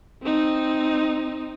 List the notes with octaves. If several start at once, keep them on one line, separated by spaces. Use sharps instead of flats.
C4 D#4